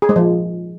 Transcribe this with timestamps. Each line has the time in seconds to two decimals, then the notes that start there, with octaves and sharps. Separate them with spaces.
0.02 G#4
0.09 G#3
0.16 F3